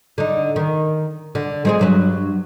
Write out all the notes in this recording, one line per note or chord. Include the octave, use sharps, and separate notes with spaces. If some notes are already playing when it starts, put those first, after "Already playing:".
D3 D#4
D#3
D3
G#3 C4 G#4
G2 F#3 B4